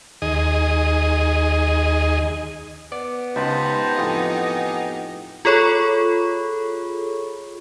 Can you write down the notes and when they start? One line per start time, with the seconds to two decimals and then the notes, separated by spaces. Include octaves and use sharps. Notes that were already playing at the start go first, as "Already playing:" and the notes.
0.22 D#2 G#4 D#5
2.92 B3 D5
3.36 C#2 D#4 G4 C5 A5 B5
3.98 F2 A2 G#4
5.45 F4 G#4 A4 C#5 B5 C#6